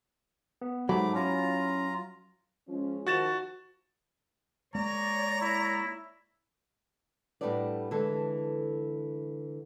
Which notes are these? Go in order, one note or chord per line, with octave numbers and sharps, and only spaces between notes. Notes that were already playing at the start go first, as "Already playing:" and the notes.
B3
G#2 F#3 A3 B5 D6
C#4 E4 F4 A#5
F3 G#3 C#4
D#3 F3 F#4 A6 E7
G#3 A#3 C#5 D5 A#5
E4
A2 G3 A3 B3 D4 D5
D3 E3 G#3 A4